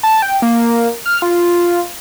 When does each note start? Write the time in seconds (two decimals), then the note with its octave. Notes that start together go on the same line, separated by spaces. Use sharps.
0.03 A5
0.22 G5
0.42 A#3
1.06 F6
1.22 F4